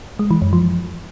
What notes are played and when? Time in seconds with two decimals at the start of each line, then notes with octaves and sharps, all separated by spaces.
0.19 G#3
0.31 E3
0.42 F#2
0.53 F3